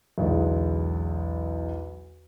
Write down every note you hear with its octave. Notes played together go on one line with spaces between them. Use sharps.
B1 E2 D3 G#3